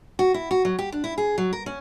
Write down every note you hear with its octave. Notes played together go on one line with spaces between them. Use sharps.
F#4
E4
F#4
F#3
G4
D4
E4
G#4
F#3
A#4
C#4